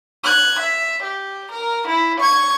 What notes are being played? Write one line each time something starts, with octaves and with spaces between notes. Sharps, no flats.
F#6 G#6
E5
G4
A#4
E4
C#6 G#6